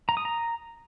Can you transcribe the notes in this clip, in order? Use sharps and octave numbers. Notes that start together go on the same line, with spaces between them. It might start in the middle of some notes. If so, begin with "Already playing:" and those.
A#5
D#6
A#5